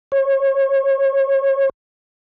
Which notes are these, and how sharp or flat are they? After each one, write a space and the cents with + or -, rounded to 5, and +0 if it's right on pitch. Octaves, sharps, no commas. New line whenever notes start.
C#5 -30